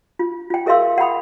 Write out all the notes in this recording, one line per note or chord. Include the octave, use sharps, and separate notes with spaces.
F4
F4 G5
G#4 A#4 E5 F5 C6 E6
F#5 G5 B5 D#6